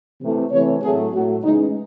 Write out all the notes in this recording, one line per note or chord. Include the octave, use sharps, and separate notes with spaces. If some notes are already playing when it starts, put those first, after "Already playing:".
C3 E3 A3
C3 E3 A3 C#5
A2 F#3 A3 G#4
A2 F#3 A3 F#4
C#3 E3 G#3 D#4